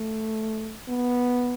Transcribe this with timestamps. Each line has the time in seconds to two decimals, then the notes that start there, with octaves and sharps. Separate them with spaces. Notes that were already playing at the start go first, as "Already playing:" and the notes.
Already playing: A3
0.88 B3